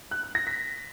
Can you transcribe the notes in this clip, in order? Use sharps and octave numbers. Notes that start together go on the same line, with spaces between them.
F#6
F#6
A#6
B6